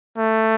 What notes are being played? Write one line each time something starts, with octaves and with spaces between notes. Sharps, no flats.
A3